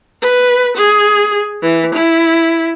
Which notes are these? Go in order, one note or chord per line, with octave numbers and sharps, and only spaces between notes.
B4
G#4
E3
E4